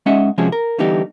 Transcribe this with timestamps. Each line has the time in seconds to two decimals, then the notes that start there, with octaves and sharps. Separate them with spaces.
0.06 G#3 C#4 D#4 D#5 E5 F#5
0.38 C3 F3 G#3 C#4 F#4 G#4
0.52 A#4
0.79 D3 E3 G3 B3 D#4 G4